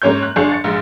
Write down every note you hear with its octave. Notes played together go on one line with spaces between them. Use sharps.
G#2 A#3 C#4 C#5 C#6 G6
F#6
G1 D4 G#4 C#6 G6 C7
A6 C#7
A#1 G#2 G#3